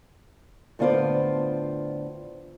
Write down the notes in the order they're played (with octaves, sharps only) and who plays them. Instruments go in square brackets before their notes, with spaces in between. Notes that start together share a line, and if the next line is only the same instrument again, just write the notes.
[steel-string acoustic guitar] A2 D3 B3 F4 C5 D5